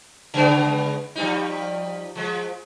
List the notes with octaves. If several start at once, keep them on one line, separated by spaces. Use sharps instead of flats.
C#3 G#3 B3
F3 G3 D#4
F3 G#3